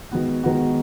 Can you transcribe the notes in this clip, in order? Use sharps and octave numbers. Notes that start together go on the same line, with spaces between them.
D#3 G#3 B3 F#4
D#3 G#3 B3 F#4